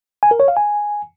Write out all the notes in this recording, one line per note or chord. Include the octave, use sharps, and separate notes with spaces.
G#5
A#4
C#5
F5
G#5